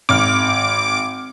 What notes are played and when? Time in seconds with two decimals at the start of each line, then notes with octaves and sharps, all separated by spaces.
0.09 G#1 D6 F6